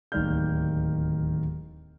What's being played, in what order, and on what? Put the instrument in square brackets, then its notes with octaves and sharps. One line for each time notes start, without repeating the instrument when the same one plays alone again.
[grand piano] D1 D#2 D#3 D5 F6 G6